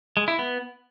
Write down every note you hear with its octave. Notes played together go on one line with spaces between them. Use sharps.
G#3
E4
B3